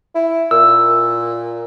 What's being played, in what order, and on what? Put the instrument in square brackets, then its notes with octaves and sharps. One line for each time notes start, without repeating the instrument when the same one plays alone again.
[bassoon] E4
[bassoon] A#2 [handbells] E6